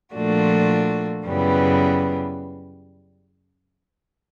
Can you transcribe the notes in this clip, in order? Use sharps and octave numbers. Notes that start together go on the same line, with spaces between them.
A#2 F3 A3 D4 F#4
F#2 C#3 E3 G3 B3